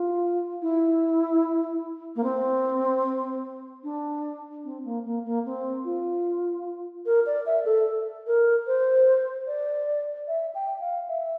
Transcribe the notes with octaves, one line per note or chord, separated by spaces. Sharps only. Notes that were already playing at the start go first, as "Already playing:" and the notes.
Already playing: F4
E4
A#3
C4
D4
C4
A#3
A#3
A#3
C4
F4
A#4
D5
E5
A4
A#4
C5
D5
E5
G5
F5
E5